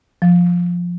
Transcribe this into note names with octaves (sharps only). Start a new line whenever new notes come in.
F3